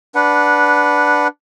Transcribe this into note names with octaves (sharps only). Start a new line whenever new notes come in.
D4 B4 F#5